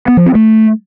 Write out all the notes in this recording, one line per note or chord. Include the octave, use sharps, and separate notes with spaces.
B3
F3
C4
A3